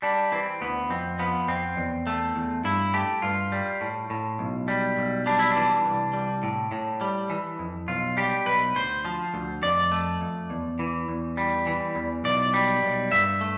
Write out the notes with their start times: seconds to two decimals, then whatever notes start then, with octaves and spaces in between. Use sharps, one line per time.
0.02 G3 D4
0.32 E3 C4
0.61 D2 B3
0.90 F2 C4
1.19 F3 B3
1.48 F2 C4
1.77 E2
2.07 A3
2.36 E2
2.64 G2 E4
2.94 A3 G4
3.22 G2 F4
3.52 G3
3.81 A2
4.10 A2
4.39 B1
4.68 G3
4.97 B1
5.26 G3 D4
5.39 E4
5.51 E3 D4
5.85 C2
6.13 G3
6.43 A2
6.72 A2
7.01 G3
7.30 E3
7.59 F2
7.88 B1 F4
8.17 G3 G4
8.46 B1 B4
8.75 D2 C5
9.05 F3
9.34 D2
9.63 F2 D5
9.92 A3
10.21 F2
10.50 E2
10.79 E3
11.08 E2
11.37 G3
11.66 E3
11.95 E2
12.24 B1 D5
12.54 G3
12.82 B1
13.12 G2 E5
13.41 A3